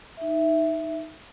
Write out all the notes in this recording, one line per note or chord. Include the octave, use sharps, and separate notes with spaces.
D#4 E5